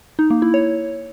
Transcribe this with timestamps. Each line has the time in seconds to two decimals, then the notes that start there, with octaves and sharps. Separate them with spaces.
0.19 D#4
0.30 A#3
0.42 E4
0.54 C#5